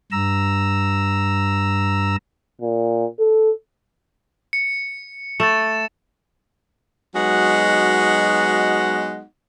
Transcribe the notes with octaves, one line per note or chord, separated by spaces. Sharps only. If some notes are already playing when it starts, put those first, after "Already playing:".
G2 A#5 E6
A#2
A4
C#7
A3 A6 C#7 E7
F#3 G#3 B3 D#4 F#4 F#5